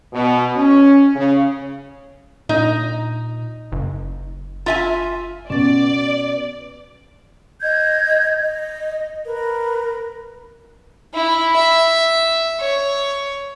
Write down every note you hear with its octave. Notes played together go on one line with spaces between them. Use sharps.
B2
C#4
C#3
A#2 D#4
F#1
F4 E5 G#5
B2 C#4 D5 A6
D#5 G6 G#6
D#5
A#4 B4
E4
E5
C#5